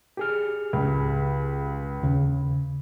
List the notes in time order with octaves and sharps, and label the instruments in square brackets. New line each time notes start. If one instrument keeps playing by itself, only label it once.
[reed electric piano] G4 G#4 F6
[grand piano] C#2
[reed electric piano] D#2 C#3